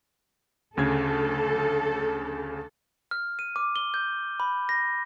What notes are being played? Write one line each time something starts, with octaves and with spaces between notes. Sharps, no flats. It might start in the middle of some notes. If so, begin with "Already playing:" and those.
D2 C#3 A4 G#6
F6
D#7
D6
G7
G6
B5
A#6